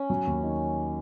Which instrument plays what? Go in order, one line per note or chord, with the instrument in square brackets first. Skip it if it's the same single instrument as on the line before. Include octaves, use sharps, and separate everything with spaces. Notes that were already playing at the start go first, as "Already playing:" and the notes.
Already playing: [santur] C#4
[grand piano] F#3
D#2
D#3